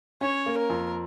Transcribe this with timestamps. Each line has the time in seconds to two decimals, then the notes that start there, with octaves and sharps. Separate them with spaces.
0.21 C#4 C#5
0.46 A#3
0.57 A#4
0.70 F2